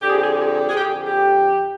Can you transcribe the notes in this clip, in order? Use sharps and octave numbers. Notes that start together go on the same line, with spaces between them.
F2 D3 G4
G#4
G4
G#4
G4
G#4
G4
G#4
G4
G#4
G4
F2 D3 G4 G#4
G#4
G4